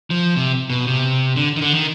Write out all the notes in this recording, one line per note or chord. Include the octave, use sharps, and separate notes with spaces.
F3
C3
B2
C3
D3
D#3
D3
D#3